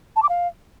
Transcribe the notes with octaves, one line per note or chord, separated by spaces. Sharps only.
A5
D6
F5